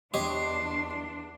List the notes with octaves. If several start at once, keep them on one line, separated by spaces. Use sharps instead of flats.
E2 D4 G4 C#5 D#5 C6